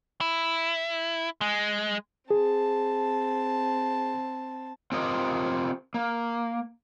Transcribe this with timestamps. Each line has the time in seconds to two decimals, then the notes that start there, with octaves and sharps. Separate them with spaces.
0.21 E4
1.41 G#3
2.31 C4 G#4 A5
4.92 C4 F4 G4 A#4 D#5
5.94 A#3